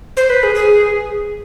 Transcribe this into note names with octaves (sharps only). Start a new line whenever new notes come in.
C5
B4
G#4
G#4